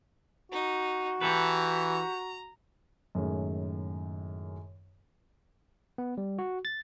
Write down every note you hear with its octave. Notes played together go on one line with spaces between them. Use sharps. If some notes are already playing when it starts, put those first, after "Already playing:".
D#4 F#4
E3 G4 A4 B4 A#5
F#2 A2 D#3 G#3
B3
G3
F#4
A6